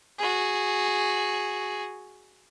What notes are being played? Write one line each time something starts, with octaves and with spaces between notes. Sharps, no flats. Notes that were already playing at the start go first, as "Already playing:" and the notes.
F#4 G#4